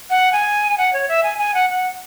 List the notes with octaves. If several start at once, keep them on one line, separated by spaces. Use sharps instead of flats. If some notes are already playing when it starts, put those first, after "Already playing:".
F#5
G#5
F#5
C#5
E5
G#5
G#5
F#5
F#5